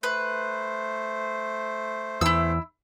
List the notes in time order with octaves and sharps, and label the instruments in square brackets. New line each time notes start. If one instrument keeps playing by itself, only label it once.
[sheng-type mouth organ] A3 C5 [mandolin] B4
[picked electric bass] E2 [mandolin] E4 E6